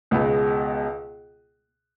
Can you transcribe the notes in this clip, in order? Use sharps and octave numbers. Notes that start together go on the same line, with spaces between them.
C#2 B2 G#3 B3